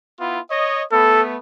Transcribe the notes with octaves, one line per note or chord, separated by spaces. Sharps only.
B3 E4 F4
C#5 D#5
A3 B3 A4